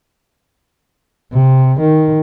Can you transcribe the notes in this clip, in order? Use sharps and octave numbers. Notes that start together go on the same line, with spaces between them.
C3
D#3